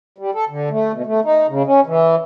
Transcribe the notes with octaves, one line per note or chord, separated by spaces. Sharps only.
G3
A4
D3
A3
B2
A3
D#4
C#3
C#4
E3